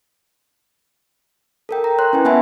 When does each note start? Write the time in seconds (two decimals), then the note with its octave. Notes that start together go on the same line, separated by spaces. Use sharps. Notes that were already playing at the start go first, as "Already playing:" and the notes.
1.69 A4 A#4 G5
1.84 A#5
1.99 C#5 C6 F#6
2.13 C#4 E4 B4 G#5
2.25 B3 E5 F#5 G#5 A5 B5